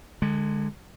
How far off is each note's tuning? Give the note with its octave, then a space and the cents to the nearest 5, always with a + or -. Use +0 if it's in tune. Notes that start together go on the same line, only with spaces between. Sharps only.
D3 +25 G#3 +0